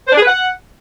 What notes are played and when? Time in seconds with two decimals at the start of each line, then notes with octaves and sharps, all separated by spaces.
0.07 C5
0.12 D4
0.17 G#4
0.22 B4
0.27 F#5